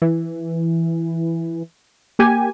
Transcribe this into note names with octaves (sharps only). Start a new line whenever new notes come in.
E3
A#3 G4 G#5